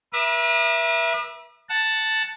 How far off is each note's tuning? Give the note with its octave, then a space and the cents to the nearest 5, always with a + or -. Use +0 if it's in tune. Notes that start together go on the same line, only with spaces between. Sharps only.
B4 -45 E5 +10 D#6 -45
F#5 +0 A5 +0